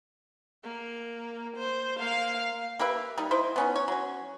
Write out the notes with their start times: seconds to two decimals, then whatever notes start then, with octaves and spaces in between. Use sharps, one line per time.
0.64 A#3
1.57 C5
2.00 A#3 F5
2.79 A#3 G4 B4 E5
3.18 G3 D#4
3.31 E4 C5 D#5
3.56 B3 C#4 D#4
3.76 C#5
3.88 F#3 C#4